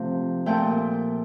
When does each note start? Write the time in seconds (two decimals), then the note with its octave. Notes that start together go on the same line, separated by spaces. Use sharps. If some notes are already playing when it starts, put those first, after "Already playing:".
Already playing: C3 F3 A3
0.46 A#2 A3 G5